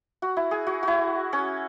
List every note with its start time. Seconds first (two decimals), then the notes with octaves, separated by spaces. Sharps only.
0.22 F#4
0.37 E4
0.51 G#4
0.67 F#4
0.83 E4 F#4
1.33 C#4